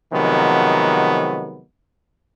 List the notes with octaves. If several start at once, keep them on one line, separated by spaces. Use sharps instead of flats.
C3 D#3 F3 F#3 G#3 B3